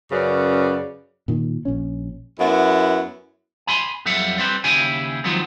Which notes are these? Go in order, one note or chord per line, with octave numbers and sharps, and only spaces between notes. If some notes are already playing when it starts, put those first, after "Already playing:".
F#2 C#3 B4 D5
A#2 D#3
A#1 C#4
F#2 B3 E4
G#5 B5 C6
F2 F#3 G3 A4 E5 F#5
G3 C4 B4 C5
D#2 C#3 E4 G4 G#4 G#5
D#3 F3 F#3 G#3 B3 C4